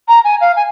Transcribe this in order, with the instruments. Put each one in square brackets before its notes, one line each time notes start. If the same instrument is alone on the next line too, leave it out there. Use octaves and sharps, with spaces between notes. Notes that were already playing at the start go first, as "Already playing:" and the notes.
[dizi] A#5
G#5
F5
G#5